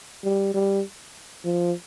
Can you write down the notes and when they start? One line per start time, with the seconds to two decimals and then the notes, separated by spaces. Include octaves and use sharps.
0.24 G3
0.54 G3
1.45 F3